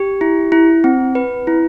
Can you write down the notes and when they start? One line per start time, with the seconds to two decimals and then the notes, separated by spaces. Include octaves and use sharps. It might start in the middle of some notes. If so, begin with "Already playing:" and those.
Already playing: G4
0.21 E4
0.52 E4
0.84 C4
1.15 B4
1.47 E4